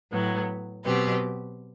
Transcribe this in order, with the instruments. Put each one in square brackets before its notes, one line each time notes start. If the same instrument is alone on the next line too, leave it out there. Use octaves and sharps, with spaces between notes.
[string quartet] A2 F#3 B3
B2 F#3 C4 G4 B4